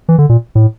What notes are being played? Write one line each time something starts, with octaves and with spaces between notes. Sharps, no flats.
E3
D3
A#2
A2